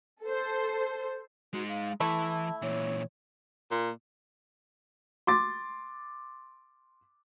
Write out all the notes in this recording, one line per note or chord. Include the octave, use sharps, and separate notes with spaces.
A4 C5
G#3 D#4 F#4
F5
E3 A3 E4 A5
A#2 E3 C#5
A#2
C6 D6 A6